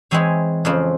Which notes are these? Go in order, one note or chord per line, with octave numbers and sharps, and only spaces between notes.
E3 G#3 C4 E4 G#4 C#5
F2 C#3 F3